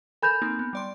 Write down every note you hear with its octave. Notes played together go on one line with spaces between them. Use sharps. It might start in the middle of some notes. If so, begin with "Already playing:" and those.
A4 A#4 G#5 B5 G6
A#3 C4 D#4
B3
G3 D5 C6